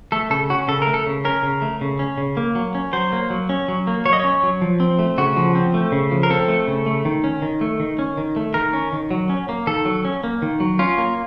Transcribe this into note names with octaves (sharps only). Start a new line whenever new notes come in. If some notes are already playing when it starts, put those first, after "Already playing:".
A3 A4
C#3 A4
C#4 F#4
C#3 A4
A#4
A3
A4
C#3
C#4 A#4
C#3
A3
C#3
C#4
C#3
A#3
F#3
C#4
F#3 C5
A#3
F#3
C#4
F#3
A#3
F#3 C#5
D#5
C#4 C#5
F#3
F3
C4
A3
C#3 F#4
F3
C4
A3
C#3
F3
A#4
C4 A4
A3
C#3
A3
D#3
C#4
D#3
A3
D#3
C#4
D#3
A3
D#3 A#4
C#4
D#3
F#3
C#4
A#3
D#3 A4
F#3
C#4
A#3
D#3
F#3
C#4 F4
A#3